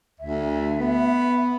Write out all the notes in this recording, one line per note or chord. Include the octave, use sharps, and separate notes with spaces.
D2 E5
B3